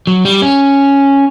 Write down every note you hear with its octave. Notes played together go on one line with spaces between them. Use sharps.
F#3
G3
C#4